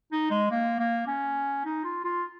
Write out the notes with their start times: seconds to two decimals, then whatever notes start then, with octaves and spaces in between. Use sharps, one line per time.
0.12 D#4
0.30 G#3
0.51 A#3
0.79 A#3
1.07 C#4
1.65 D#4
1.84 F4
2.04 F4